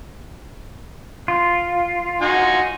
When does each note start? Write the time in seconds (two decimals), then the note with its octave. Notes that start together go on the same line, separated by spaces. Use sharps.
1.28 F4
2.21 D#4 F#4 G#5